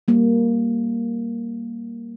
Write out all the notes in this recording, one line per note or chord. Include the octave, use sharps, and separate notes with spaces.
G3 A#3